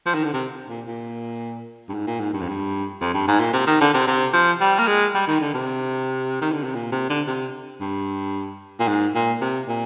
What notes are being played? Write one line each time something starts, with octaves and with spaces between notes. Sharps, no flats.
F3
D#3
D3
C3
A#2
A#2
G2
G#2
A#2
G#2
G2
F2
G2
F2
G2
G#2
A#2
C3
D#3
D3
C3
C3
F3
G3
A#3
G#3
G3
D#3
D3
C3
D#3
D3
C3
A#2
C3
D3
C3
G2
A#2
G#2
A#2
C3
A#2